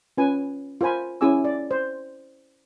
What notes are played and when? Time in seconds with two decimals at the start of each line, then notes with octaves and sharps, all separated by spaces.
0.17 C#4 F4 B4 G#5
0.81 F4 A#4 C5 G#5 B5
1.21 C#4 E4 G#4 G#5 D6 E6
1.45 D5
1.71 C5